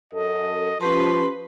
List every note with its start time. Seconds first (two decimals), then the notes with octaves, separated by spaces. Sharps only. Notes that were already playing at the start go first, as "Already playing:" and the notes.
0.13 F#2 A4 D#5
0.81 F3 C#4 G4 B4 A5 C6